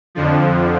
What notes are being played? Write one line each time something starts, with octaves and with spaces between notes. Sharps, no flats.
F2 D3 F3